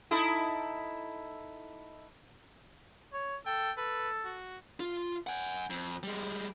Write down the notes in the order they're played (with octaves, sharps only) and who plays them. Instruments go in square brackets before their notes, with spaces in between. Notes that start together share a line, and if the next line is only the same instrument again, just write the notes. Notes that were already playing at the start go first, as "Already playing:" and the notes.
[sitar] D#4 E4 A4
[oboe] C#5
[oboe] A4 [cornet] G5
[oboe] A4 [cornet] B4
[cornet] F#4
[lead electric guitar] F4
F#5 G#5
F2
G3 G#3